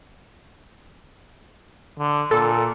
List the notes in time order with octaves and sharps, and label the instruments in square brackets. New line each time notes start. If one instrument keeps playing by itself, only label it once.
[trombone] D3
[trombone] A#2 [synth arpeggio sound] A4